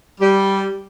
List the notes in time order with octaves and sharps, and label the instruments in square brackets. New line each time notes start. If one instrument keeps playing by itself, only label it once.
[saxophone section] G3